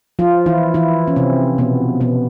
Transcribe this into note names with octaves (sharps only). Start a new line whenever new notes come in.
F3 F4
E3 E4
E3 E4
C#4
C3 C4
B2 B3
B2 B3